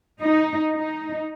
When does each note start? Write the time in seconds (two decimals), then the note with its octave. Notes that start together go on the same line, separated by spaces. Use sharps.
0.21 D#4
0.73 D#4